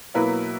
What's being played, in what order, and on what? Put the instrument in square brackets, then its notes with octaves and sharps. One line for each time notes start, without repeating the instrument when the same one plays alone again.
[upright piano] B2 F#3 A#3 E4 B4